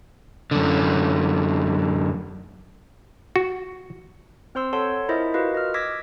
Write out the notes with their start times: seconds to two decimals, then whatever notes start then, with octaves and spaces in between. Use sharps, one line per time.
0.51 F#2 D3
3.36 F#4
4.55 C4 C5 C6 E6
4.73 A4 C#5 F#5 A5 C6
5.09 E4 F4 A#4 C5 D#5 E5
5.34 F4 F#4 A#4 B4 D#5 F5
5.54 D#5 F6
5.74 D6 E6 G#6 A#6 B6